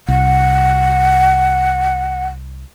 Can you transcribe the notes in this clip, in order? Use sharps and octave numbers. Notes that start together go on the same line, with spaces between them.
C2 F#5